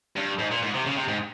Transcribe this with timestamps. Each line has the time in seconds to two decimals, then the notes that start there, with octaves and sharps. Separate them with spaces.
0.16 G2
0.39 G#2
0.51 A#2
0.62 G#2
0.74 C3
0.86 C#3
0.96 C3
1.08 G#2